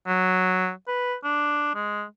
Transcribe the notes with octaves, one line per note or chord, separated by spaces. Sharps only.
F#3
B4
D4
G#3